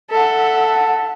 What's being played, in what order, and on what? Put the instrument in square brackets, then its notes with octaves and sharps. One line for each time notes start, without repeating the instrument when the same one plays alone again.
[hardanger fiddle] A4 [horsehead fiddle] E5 F#5